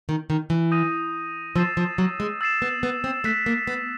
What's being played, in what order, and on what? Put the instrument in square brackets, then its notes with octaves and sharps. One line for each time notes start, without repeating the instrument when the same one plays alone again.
[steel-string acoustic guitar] D#3
D#3
E3
[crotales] D#6 G6 A#6 D#7
[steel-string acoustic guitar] F3 [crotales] E6 A6 C7 E7
[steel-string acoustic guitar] F3
F#3
G#3
[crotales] E6 A6 C7 E7
[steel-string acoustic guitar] B3
B3
C4
[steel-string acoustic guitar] A3 [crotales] F#6 B6 E7
[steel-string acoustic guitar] A#3
B3